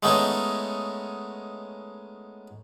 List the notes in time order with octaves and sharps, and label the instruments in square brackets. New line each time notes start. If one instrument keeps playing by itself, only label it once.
[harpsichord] G#3 A3 B3 C#4 D#4